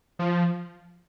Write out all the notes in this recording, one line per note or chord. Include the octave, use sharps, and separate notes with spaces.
F3